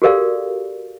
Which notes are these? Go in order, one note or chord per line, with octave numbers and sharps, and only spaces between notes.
F#4 G4 A4 A#4 D5 F5